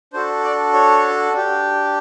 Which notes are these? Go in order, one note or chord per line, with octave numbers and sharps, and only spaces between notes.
D4 F#4 A4 C5
D5
C#5
D4 G4